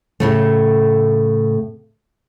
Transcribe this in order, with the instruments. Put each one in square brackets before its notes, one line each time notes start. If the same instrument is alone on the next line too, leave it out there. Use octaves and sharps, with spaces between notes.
[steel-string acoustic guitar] A2 C#3 A3